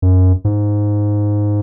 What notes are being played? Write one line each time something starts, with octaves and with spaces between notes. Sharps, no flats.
F#2
G#2